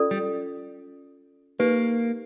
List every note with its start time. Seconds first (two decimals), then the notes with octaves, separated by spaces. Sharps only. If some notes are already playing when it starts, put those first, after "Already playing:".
Already playing: C#4 F4 A4 D5
0.11 G3
1.59 A#3 D#4 G4 B4